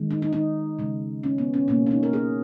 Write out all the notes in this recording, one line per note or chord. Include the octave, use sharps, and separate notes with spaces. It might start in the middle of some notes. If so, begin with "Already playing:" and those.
Already playing: D#3 G#3
D#4
D#4
D#4
C#3 G#3
C#4
B3
C#4
B2 F#3 A#3 C#4
C#4
D#4
A#4
G#4